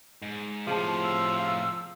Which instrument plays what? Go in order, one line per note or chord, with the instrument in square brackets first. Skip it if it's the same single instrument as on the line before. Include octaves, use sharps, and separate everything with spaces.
[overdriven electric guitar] G#2
[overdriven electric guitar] A2 C3 [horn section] F3 [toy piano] G#4 A5
[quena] E6
[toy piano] F5